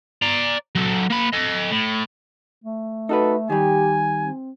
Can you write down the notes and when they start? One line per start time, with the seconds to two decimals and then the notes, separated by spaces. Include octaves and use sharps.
0.22 D5 A#5
0.75 F#3 A4
1.10 A#3 B5
1.33 A4 D#5
1.71 A2
2.64 A3
3.09 D#4 F#4 A4 B4
3.50 D#3 G3 G4 G#5
4.18 C4